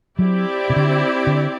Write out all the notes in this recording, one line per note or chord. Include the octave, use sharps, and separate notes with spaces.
F#3 C4 E4 G4 D5
C3
D3
D3